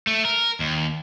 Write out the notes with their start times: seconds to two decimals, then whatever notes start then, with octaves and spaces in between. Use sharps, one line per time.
0.07 A3
0.25 A#4
0.60 D#2